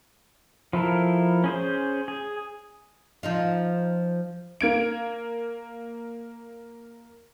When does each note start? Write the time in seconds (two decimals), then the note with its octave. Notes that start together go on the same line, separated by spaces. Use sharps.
0.73 F3 E4 A4 A#4
1.44 C#4 G#4 C5
2.08 G#4
3.23 F3 D#4 F4
4.61 A#3 G#6 D7